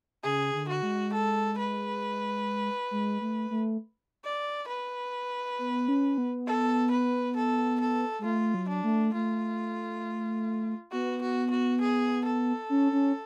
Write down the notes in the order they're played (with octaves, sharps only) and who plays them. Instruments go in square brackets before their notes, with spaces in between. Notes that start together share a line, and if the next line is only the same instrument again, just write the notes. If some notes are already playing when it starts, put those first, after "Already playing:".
[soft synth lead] C#3 [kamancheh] G#4
[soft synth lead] D3
[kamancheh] F#4
[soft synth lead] G#3
[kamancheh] A4
B4
[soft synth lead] G#3
A3
A3
[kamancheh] D5
B4
[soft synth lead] B3
C#4
B3
[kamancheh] A4
B4
A4
A4
[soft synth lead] G#3
[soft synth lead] A3 [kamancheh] F4
[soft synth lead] F#3
[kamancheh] D4
[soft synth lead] A3
[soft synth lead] A3 [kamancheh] F4
[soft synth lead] B3 [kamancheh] F#4
[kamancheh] F#4
F#4
G#4
A4
[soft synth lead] C#4
C#4